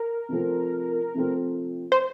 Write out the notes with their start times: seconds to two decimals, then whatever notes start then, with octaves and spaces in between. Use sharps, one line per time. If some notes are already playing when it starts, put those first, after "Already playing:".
Already playing: A#4
0.29 C3 F3 A3 C4
1.15 C3 F3 A3 C4
1.92 C5